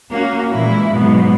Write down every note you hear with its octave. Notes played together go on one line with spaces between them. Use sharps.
A#3 C#4 F#4
A#2 E3 G#3 E4
G#2 B2 F#3 B3